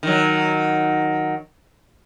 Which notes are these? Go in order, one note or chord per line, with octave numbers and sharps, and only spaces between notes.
D#3 F#3